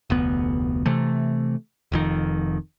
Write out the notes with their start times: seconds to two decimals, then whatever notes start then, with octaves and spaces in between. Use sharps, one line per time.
0.10 F1 D2 B3
0.86 C3 E3 A3
1.92 F1 F2 D#3